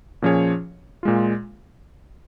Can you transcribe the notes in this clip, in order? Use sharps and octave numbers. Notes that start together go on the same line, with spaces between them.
A#2 F3 C#4 G#4 C#5
A#2 G#3 F4